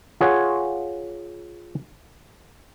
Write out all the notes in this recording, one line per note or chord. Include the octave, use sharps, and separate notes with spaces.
F4 G#4 C#5 F#5